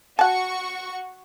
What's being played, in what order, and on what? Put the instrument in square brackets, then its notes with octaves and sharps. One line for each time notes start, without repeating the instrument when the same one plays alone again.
[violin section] F#4 C#6 [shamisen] F#5 A5